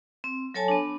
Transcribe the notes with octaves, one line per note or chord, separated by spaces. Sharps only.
C4
F#3 A4 C#5 G#5 A5
B3 D4